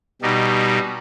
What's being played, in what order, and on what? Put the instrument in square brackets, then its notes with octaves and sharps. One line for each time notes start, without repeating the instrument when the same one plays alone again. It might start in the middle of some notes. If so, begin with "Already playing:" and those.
[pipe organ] B2 G3 D#4